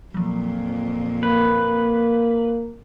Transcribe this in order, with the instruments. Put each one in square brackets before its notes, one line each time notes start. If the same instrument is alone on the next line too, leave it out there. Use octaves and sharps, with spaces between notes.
[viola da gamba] F2 A#2 [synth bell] F3 F#3
[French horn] A#3 [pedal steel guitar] B4